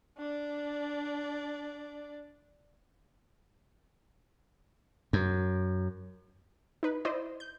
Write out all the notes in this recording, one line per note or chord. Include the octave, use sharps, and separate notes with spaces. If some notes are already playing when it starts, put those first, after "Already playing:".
D4 D5
F#2
D#4 B4
E4 C5 D5 D#5
G6